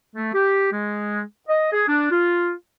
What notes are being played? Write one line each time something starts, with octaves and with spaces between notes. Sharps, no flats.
A3
G4
G#3
D#5
G#4
D4
F4